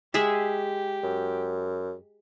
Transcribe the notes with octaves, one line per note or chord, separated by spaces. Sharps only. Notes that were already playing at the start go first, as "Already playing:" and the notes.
G#3 G4 G#4 E5
F#2